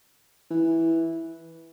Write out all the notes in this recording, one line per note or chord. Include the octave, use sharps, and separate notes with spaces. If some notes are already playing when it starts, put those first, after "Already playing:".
E3